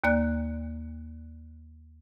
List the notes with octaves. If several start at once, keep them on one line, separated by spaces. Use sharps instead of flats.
D#2 A#3 D5 F#6